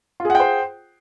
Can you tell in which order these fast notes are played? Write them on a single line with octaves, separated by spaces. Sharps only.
F4 G#4 F#5 G5 C5